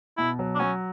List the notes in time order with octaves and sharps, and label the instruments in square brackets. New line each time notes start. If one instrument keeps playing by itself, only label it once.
[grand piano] B2 [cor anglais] E4
[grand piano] F#3
[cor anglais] D4
[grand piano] F#3 [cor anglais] C#4